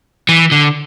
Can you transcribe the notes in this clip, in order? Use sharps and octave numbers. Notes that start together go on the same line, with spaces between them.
E3
D3